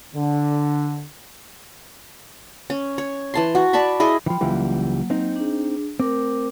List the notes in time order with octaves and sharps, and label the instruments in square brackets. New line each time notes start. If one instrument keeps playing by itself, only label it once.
[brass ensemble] D3
[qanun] C#4
C#5
E3 A5 C6
F#4
D5 A5 B5 C#6
E4 G#4 D#5
[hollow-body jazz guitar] E3 F3 [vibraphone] G5 B5
[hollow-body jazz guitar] C#2 E3 G3 [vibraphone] F#3 A#3
[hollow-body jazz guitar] C4 D#4
[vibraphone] D4 G#4
[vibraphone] A3 A#4 D6 [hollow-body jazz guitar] C4